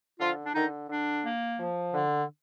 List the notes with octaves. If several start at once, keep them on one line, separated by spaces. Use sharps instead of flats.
D3 F3 F4
D4
D3 D#3 D#4
D3 D4
A#3
F3
D3